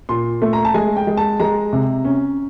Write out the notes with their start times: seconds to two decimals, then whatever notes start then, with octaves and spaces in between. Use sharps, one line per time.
0.09 A#2 C6
0.42 A3
0.53 A#5
0.65 A5
0.74 G#3 G#5
0.97 G5
1.07 G#3
1.17 A5
1.40 G#3 A#5
1.73 C3
2.05 C#4